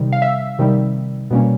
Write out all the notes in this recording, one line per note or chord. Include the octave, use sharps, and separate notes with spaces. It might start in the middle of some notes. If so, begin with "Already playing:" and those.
Already playing: C3 D#3 G3
F5
E5
C3 D#3 G3
B2 G3 A#3 C#4